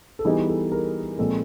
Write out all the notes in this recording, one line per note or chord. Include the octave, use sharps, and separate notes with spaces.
A4
E3 G3 B3 D#4 G#4
A4
G#4 A#4
A#2 F3 G#3 C4 A4